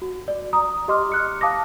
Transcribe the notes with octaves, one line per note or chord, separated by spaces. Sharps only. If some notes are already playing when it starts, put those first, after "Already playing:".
F#4
D5
A#5 D#6
G4 D#5 C6 D6 F6
F6 F#6 C#7
F5 A5 D6 D#6 A#6